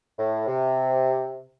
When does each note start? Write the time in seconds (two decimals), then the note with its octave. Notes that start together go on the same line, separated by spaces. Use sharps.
0.18 A2
0.47 C3